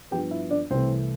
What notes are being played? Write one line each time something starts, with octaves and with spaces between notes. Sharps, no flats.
G2 F3 B3 G4 G5
E4 E5
D4 D5
C2 C3 E3 A3 C4 C5